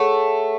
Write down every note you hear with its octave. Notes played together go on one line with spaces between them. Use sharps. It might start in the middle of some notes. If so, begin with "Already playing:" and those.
Already playing: A3 G#4 C#5 F#5